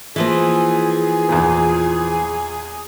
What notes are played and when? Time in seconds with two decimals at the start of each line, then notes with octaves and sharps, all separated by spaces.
0.16 E3 F3 A#3 G#4
1.29 E2 A#2